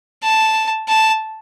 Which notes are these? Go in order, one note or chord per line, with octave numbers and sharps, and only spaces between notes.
A5
A5